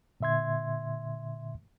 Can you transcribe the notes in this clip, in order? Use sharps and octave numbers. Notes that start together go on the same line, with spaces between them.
A#2 D3 E5 C6 G#6